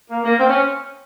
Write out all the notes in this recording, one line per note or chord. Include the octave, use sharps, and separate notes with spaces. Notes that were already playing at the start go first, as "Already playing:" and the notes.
A#3
A#3
C4
C#4